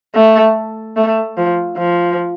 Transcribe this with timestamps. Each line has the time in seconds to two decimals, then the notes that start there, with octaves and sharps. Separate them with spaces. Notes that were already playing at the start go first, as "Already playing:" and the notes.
0.15 A3
0.96 A3
1.37 F3
1.78 F3